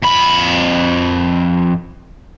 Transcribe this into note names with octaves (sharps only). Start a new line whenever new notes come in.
F2 B5